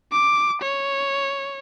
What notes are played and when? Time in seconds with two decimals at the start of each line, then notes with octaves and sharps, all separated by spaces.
0.12 D6
0.62 C#5